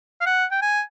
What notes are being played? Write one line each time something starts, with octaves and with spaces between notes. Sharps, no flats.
F5
F#5
G5
G#5